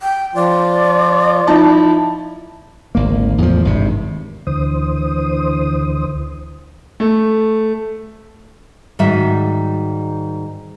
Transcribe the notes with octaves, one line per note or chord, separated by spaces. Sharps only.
G5
F3 F4 D5
F3 D#4 E4 A5
G#1 D2 A#3
E2 A2 F3
G#1 G2 C3
D2 D3 E3 C5 D#6
A3
G#2 D#3 G3 F#4 E5